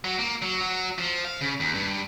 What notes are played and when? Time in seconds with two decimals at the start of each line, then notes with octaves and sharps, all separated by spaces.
0.04 F#3
0.19 A#3
0.42 F#3
0.61 F#3
0.98 F3
1.25 F5
1.41 C#3
1.60 D#2
1.74 G2